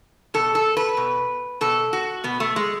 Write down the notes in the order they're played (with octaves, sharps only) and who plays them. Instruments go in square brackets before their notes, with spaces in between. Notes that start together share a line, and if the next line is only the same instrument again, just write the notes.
[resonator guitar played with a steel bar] B2 A4
A4
B4
B2
B2 A4
F#4
B2 B3
A3
G#3